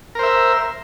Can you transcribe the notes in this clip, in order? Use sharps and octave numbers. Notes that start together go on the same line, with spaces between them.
A#4 C5 E5